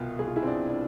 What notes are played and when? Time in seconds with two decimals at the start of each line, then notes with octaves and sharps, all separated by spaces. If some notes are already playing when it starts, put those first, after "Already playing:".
Already playing: C2 B2 F4
0.19 C2 G#4
0.28 F4
0.36 E4 G#4
0.43 C4
0.47 D4
0.60 B2
0.70 D4